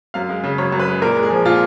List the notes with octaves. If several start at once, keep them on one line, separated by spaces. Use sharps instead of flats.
F#2 F5
G#3
C#3
F#2 C#5
F#2
B4
G#3
A#2 A#4
G#3
G#4
F3
A#2 F4